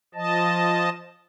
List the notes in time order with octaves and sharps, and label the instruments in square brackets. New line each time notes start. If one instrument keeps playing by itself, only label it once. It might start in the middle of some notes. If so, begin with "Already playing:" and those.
[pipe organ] F3 D#5 A5